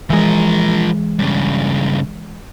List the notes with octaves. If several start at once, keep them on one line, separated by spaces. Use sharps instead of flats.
E3 F3 G#3 A#4
G2 C#3